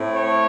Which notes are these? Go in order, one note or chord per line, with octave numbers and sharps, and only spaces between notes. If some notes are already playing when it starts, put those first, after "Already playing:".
Already playing: A2 A3 C4
C#5